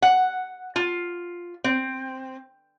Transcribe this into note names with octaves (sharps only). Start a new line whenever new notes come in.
F#5
F4
C4